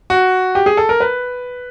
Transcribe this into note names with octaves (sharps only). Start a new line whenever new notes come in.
F#4
G4
G#4
A4
A#4
B4